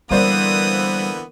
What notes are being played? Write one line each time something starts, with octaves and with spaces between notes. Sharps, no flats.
D3 E3 G3 A#3 B3 C5 D5 D#6